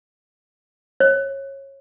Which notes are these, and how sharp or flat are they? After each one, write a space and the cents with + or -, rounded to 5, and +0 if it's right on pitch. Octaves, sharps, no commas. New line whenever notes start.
C#5 -20